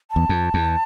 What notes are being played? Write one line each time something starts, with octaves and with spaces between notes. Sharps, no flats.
A5
E2
F2
E2